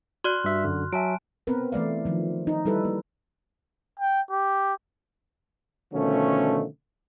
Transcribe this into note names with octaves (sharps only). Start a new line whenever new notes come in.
F#4 D5 C6 F6 F#6
G2 E5
F#2 D3
F#3 E5 G#5 A5 D7
B3 C4 A#4 B4
E3 A3 D5 F5
D#3 F3
D#4
G3 E4 A4 B4
A#3
G5
G4
B2 D3 D#3 F3 A3 C#4